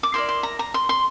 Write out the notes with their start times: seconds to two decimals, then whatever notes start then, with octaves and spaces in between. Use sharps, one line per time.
0.03 D6
0.14 E4 A#4 D5 C6
0.29 C6
0.43 A#5
0.59 A#5
0.74 C6
0.89 C6